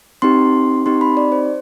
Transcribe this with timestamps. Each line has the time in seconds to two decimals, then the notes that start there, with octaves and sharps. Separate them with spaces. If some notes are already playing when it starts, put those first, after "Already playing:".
0.22 C4 D#4 G4 C6
0.86 C4 D#4 G4 C6
1.01 B5
1.17 D5
1.32 C5